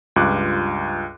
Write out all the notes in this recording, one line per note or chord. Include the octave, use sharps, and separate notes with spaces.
C#2 G2 F4 D6 F#6